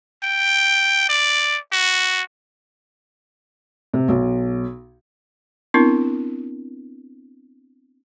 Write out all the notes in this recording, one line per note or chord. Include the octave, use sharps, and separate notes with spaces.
G5
D5
F#4
C3
B1
B3 C4 D4 E4 A#4